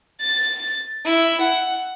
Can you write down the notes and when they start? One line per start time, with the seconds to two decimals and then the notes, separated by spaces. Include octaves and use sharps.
0.21 A6
1.06 E4
1.43 F#5